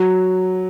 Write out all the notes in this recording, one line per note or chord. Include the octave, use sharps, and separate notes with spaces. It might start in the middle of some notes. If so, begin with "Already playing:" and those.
Already playing: F#3